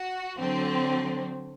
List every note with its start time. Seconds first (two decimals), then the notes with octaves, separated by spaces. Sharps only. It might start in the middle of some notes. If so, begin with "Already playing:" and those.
Already playing: F#4
0.38 D3 F#3 C4